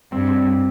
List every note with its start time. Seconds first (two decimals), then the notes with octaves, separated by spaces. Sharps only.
0.12 G2 C4
0.28 C4